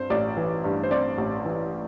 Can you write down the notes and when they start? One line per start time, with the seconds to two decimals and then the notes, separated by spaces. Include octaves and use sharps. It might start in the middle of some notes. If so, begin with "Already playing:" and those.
Already playing: G2 C4 C5
0.10 A1 D5
0.37 E3
0.64 G2
0.83 C5
0.91 C4 D5
1.18 A1
1.45 E3